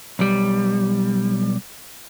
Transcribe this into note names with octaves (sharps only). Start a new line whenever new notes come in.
B1 G3